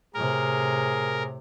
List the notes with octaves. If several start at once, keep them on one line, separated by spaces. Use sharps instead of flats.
A2 C3 G#4 A#4